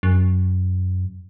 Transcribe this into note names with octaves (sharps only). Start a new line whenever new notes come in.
F#2